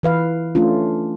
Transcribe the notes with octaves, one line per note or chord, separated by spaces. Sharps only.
E3 B4 F5
A3 C#4 D4 F4